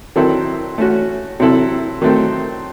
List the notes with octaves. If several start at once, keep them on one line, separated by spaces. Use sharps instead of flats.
D#3 F#3 C4 E4 A4
A3 C#4 F#4
C3 F#3 C4 E4 A4
D#3 F#3 A3 C4